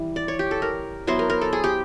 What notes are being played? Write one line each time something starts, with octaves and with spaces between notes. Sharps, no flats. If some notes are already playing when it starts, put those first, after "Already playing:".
Already playing: E3 G3
D5
C#5
G4
A4
A#4
F#3 B3 E4 C5
A#4
A#4
A4
G#4
G4